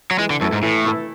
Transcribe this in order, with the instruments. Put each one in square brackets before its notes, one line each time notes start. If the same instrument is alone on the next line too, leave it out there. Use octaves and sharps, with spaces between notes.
[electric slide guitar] F#3
[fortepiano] E3 [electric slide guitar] G#3
[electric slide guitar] D3
[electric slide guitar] F#2 [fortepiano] A3 E4 A4
[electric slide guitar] G#2
[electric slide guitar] A2 [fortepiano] E3
[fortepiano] A3 E4 A4